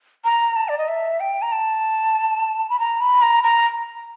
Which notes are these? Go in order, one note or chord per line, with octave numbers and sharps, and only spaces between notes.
A#5
A5
D5
D#5
E5
G5
A#5
A5
B5
A#5
B5
A#5
A#5